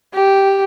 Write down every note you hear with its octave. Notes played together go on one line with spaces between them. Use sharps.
G4